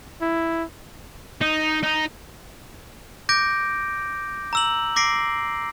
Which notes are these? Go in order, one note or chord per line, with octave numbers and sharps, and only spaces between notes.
E4
D#4
D#4
D6 G6 A#6 D7
A#5 E6 F#7
D6 A#6 C7 D7